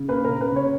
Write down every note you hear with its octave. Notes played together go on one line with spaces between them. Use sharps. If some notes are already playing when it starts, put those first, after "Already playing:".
Already playing: C#3
A#3 B4
A#4
C#3
B4
C#3 C#5